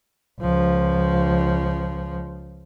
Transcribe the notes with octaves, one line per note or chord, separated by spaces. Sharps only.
C#2 F3